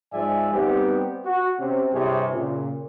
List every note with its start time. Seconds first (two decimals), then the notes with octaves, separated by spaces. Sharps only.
0.13 G#2 F3 G#3 D5 E5 G#5
0.53 G3 B3 C4 D#4 G4
1.26 F#4
1.59 C3 C4 C#4
1.93 G2 C3 E4 G#4 C#5 D5
2.32 A#2 C#3